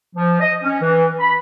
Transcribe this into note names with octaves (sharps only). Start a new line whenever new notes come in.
F3
D#5
C#4
E3
B5